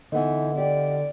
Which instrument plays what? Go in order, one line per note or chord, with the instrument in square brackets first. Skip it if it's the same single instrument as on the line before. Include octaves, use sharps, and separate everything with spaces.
[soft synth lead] D3 [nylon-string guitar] E3 B3 D#4 [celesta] D#5 F#5
[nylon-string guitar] G4 [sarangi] D5